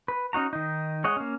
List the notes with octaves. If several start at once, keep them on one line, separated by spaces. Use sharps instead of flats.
B4
C#4 D#4 F#4 A#5
D#3 D#4
G#3 C#5 D#5 F#5
A#3 C#4